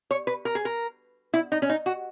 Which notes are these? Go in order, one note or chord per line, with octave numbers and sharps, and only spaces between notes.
C#5
B4
A#4
G#4
A#4
E4
D#4
C#4
D#4
F#4